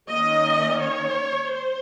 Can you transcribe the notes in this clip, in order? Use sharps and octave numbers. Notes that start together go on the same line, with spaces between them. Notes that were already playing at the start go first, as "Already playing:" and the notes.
D#3 A#3 C#4 D#5
C#5
C5